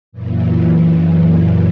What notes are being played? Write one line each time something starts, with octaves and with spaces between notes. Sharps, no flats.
F#2 A#2 E3